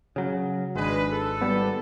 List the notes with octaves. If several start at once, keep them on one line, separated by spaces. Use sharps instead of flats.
C#3 F#3
G#1 G#3 D4 B4
A4
G#1 G3 B3